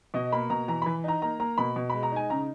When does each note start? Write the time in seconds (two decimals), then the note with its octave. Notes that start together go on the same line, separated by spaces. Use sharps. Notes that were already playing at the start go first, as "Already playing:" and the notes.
0.14 B2 D#5
0.32 A#3 B5
0.50 B2 A#5
0.68 E3 A#5
0.82 E3 B5
1.04 D#4 A#5
1.22 A#3 A#5
1.40 A#3 A#5
1.58 B2 B5
1.76 B2
1.90 G#3 B5
2.03 A#5
2.12 D#4 G#5
2.30 C#3 A#5